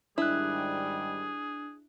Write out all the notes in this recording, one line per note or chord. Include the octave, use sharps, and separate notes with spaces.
G#2 D#3 G3 D4 E4 G#4 F#6